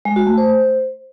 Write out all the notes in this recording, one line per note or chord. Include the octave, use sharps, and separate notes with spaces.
G#3
F#4
A3
C5